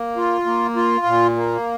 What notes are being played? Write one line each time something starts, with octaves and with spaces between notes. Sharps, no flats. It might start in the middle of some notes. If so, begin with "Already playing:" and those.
Already playing: A#3
F4
A#3
F4
A#2
A#3